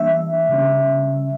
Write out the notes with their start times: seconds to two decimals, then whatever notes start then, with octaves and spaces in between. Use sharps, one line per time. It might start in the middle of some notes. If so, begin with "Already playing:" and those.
Already playing: E3 G3 A#3 D4 E5
0.49 C#3 G3 C#4